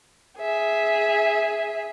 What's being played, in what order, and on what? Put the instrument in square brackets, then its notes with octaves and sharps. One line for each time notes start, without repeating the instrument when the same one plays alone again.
[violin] G#4 E5